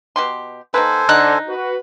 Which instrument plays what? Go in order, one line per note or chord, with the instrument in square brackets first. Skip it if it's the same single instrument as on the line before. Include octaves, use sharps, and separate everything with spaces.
[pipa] B2 G4 C6
[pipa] D#3 A#3 B4 [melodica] A4 C5 G#5
[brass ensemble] D3 [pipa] D#4 [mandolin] F#6
[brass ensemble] F#4 B4